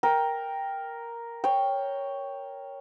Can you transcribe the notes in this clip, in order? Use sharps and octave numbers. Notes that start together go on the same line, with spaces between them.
A#4 G5
C#5 G5